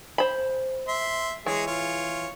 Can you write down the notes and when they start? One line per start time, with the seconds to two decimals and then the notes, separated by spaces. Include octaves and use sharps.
0.18 C5 B5
0.88 E5 C6
1.46 E3 G#3 G#4 C#5
1.67 F4 C#5